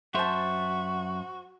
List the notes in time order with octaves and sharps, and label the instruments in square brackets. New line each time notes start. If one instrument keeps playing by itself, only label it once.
[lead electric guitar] F#2 E5 [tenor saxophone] F#4 [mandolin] C5 A5